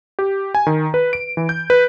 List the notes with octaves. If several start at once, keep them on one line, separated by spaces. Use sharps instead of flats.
G4
G#5
D#3
B4
D7
E3
G6
B4